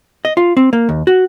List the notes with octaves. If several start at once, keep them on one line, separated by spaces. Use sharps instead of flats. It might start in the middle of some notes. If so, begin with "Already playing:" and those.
D#5
F4
C4
A#3
D#2
F#4